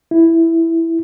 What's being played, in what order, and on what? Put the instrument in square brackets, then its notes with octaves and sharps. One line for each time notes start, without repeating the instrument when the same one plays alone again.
[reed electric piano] E4